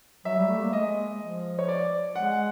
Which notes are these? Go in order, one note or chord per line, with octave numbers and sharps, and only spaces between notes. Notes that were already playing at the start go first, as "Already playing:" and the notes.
F#3 E5
G3
A3
A#3
G#3 D#5
F3
C#5
D5
G#3 F#5